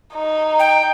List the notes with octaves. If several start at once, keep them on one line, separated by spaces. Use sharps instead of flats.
D#4
G5